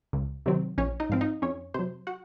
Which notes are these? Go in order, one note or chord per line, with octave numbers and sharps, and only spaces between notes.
C#2
C3 D#3 F#3 C4
A#1 C#4 C#5
D#4 D#5
G#2 F3 C4 F5
D#4 D#5
F2 C#4 C#5
C3 F#3 C5
F#4 F#5